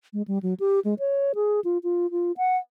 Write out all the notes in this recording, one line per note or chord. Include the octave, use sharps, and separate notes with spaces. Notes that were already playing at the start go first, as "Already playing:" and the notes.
G#3
G3
F#3
G4
G#3
C#5
G#4
F4
F4
F4
F#5